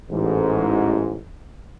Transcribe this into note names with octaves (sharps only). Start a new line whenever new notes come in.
A1 G#2